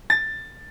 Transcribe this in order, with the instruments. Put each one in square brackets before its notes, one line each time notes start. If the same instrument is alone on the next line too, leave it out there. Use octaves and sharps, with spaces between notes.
[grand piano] A6